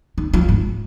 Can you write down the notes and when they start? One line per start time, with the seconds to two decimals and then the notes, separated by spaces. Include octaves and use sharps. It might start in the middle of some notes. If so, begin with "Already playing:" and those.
0.18 D#3
0.34 F3
0.49 G#2